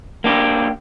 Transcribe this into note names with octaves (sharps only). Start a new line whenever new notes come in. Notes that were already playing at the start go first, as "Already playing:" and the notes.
A#3 D4 G4